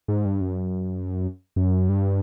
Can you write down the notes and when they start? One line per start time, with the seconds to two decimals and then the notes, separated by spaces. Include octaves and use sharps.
0.08 G#2
0.25 G2
0.41 F#2
1.56 F#2
1.89 G2